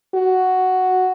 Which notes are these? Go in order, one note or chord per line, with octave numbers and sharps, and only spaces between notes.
F#4